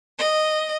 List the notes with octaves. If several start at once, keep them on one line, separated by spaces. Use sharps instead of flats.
D#5